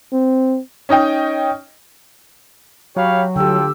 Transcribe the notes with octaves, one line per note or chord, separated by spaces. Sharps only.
C4
C#4 D#4 D#5 G5
F#3 G4 C#5 F5 B5
D3 F4 G4 A4 G5 E6